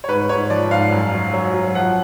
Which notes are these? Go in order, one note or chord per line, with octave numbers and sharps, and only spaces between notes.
C#5
G#2 B4
G#2 C#5
F3 D5
G#2 F5
F#2
F#3
F#3
F#3
F3 F#5